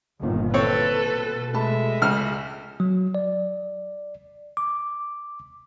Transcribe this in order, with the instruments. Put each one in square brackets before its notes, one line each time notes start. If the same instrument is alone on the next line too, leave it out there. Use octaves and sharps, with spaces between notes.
[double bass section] G1 D#3 [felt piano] A#2
[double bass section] E3 [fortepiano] C4 C#5 [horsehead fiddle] A4 B4
[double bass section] B2
[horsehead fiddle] G#3 E5 [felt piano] A3 A5 B5
[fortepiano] C#2 F6
[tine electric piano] F#3
D5
D6